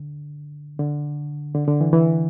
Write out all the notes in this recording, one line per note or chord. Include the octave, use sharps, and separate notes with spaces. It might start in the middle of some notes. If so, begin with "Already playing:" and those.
Already playing: D3
D3
D3
D3
E3
E3